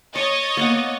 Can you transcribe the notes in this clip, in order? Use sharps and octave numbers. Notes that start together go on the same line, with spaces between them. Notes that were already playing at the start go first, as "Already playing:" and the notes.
C#5 D#5 C#6 A6
A#3 B3 F#5